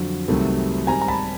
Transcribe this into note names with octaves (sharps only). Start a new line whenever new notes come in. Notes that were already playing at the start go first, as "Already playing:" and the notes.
Already playing: F2 D3 F#3
C2 C3 D#3 F#3 A3
G#2 D#3 G3 C4 G#5 A#5
A#5
A5 B5